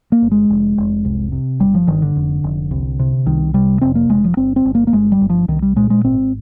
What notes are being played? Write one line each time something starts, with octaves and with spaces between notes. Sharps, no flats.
A#3
G1
G#3
F1
F1
C2
C3
G1 G3
F3
G1 D#3
D3
F1
F1
C2
C3
C2 D#3
C3 G3
F1 C4
A#3
F1 G#3
F3
G1 C4
C4
G1
A#3
A#3
G1 G#3
G3
G1
F3
C2 D#3
G3
A#2 G#3
G#3
G#1 C4